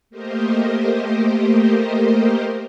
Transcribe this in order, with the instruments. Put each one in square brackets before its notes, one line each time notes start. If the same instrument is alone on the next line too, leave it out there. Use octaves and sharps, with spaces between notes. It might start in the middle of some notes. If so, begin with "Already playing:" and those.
[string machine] A3 A#3 G4 A#4 C5 D#5